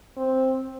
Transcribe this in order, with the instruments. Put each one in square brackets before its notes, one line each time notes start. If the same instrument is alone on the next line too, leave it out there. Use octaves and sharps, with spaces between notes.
[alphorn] C4